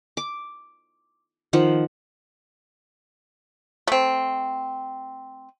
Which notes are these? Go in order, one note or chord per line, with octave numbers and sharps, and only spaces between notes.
D6
D#3 F3 F#5
A3 C4